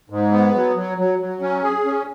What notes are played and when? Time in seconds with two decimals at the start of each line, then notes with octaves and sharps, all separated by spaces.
0.10 G#2
0.32 B3
0.54 F#3
0.75 F#3
0.98 F#3
1.19 F#3
1.41 C#4
1.63 G#4
1.85 C#4